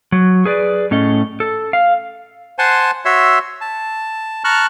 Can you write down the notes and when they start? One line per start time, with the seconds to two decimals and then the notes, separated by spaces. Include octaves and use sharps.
0.12 F#3
0.45 G#4 B4 D5
0.91 A2 C#4 A4 D#5
1.40 A4
1.73 F5
2.59 C5 F#5 G#5 A5 C6
3.05 F#4 C#5 E5 C6 E6
3.61 A5
4.44 A5 A#5 C#6 F6 F#6